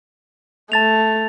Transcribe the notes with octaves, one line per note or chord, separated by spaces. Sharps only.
A3 A5 A6 F7